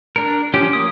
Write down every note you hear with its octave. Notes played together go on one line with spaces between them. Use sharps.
D4 A#4
F3 C#4 G4
A#3 D#6